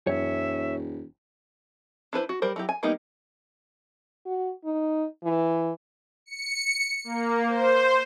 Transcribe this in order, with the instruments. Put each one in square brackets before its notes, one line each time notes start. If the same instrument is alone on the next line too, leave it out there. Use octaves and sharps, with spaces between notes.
[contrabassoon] E1 [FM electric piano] F#2 [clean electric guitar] C#5 [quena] E5
[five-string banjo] D4 E4 B4 C5
F#4
G3 A#4 C5
F#3 E4 G4
G#5
G3 A#3 B3 D#4 G4
[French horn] F#4
D#4
E3
[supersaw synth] C#7
A#3
C5